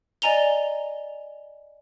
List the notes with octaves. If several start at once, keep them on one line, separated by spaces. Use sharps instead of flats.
D5 D#5 G#5 A#5 F7 G7